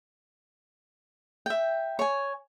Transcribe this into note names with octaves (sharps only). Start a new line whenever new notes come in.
E5 G5
C#5 G#5